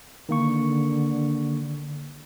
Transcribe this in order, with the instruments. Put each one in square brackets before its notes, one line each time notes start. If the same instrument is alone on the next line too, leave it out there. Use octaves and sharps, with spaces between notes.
[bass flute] D3 [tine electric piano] D#3 A#3 C#6